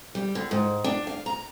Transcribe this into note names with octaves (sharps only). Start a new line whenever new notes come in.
G3
D3
G#2
D4
F5
A#5